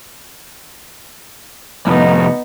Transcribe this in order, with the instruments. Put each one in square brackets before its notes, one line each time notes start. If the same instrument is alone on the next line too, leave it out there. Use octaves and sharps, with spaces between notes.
[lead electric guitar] C2 F2 [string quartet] B3 D#4